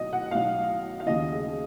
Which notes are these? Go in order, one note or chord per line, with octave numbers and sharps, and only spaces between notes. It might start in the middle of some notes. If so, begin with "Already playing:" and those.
Already playing: B1 B2 D#5
F#5
B1 B2 F5
F5
D#2 C#3 F3 D#5
G#4